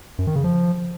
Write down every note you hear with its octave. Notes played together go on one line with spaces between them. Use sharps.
F#2
D#3
C#3
F3